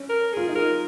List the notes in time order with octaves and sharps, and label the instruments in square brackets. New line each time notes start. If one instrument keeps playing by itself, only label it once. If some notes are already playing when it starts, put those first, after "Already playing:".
Already playing: [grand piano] C#4
[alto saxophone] A#4
[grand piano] F4 [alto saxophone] G#4
[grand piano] D#4
[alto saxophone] A#4